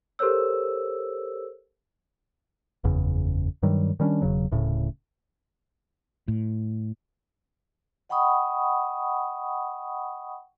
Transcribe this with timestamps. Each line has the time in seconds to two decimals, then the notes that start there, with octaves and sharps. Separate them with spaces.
0.19 G4 A4 A#4 C5 C#5 E6
2.84 F#1 E2 C#3
3.63 G2 D#3 F#3 G3
4.00 D#3 G3 C#4 D4
4.22 E1 C#3 F#3
4.52 D1 A2 C#3
6.28 A2
8.09 D#5 F#5 G5 B5 C#6 D#6